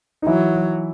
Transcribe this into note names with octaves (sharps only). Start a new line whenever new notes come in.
D#4
E3 F#3 E4